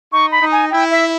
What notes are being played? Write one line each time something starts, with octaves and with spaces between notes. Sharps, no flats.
D#4 C#6
B5
D#4
G#5
E4 G5
E5